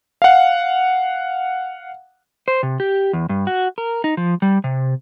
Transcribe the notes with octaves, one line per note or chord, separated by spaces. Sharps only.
F5 F#5
C5
C3
G4
E2
G2
F#4
A#4
D#4
F3
G3
C3